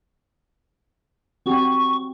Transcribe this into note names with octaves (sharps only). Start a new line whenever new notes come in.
C4 F#4 G4 C#6